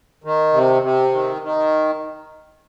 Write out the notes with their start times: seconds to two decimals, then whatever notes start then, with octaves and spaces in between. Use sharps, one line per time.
0.24 D#3
0.53 C3
0.83 C3
1.12 D#3
1.42 D#3